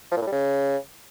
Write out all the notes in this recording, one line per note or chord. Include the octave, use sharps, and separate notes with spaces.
F3
A#2
A2
G3
C#3